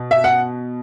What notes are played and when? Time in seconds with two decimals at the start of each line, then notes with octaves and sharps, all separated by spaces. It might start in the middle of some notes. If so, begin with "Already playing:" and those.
Already playing: B2
0.11 E5
0.24 F#5